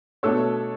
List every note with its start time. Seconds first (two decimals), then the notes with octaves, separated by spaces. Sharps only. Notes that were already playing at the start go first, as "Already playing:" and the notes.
0.23 B2 A3 D4 A4 C#5